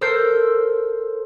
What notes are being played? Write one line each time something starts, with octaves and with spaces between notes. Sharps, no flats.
A4 A#4 C5 E6 G6 C7